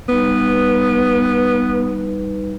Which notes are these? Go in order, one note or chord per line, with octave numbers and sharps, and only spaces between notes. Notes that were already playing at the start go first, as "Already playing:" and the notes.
G3 B3 D#4 B4